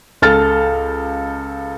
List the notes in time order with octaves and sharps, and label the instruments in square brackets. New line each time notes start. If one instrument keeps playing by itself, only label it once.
[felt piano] C#2 A4 F6 A6